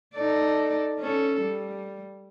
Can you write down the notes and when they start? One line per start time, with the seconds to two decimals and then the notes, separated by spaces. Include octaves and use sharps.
0.14 D#4 A4 D5
1.00 C#4 A4
1.41 G3